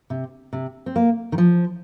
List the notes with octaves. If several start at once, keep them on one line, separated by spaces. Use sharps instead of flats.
C3
C3
C4
A#3
D#3
F3